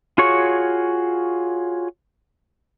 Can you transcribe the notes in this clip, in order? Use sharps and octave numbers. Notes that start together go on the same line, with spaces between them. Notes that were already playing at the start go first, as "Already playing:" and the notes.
F4 F#4 G#4 C#5 C#6